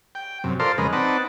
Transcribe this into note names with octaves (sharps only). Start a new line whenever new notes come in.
G5
F#2 C3
F4 A4 A#4 C5 D5 C6
F2 C#3 G#3 A#4 B4 D#5
C4 D#4 B4 D5 F#5 A5